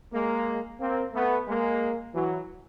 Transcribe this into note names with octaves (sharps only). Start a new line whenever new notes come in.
G#3 A#3
A#3 C4
A3 B3
G#3 A#3
E3 F#3